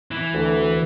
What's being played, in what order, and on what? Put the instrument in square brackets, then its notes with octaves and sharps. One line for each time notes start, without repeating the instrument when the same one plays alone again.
[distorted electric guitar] E3
[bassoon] D2